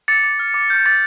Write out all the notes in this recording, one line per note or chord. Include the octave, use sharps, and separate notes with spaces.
D6 A6 C#7
D6
F6
D6
F6 G6
D6 A6